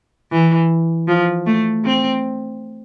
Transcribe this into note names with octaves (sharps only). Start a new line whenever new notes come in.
E3
F3
A3
C4